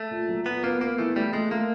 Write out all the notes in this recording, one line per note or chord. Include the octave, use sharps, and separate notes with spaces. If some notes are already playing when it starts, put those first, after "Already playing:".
Already playing: A3
A#2
F#3
A#2 B3
A#3 B3
A#3 B3
E3 A3
G3 A3
G#3 A3
A3 A#3